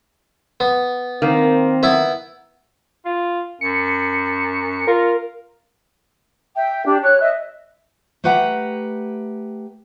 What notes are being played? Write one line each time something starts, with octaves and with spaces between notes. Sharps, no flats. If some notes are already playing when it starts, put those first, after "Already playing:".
B3
D#3 A#3 C4 A#4
B3 E4 B4
F4
F#2 C#7
F4 A#4
E5 G5
D4 G4
C#5 F#6
D#5 E5
A3 G4 B4 F#5 G5 A#5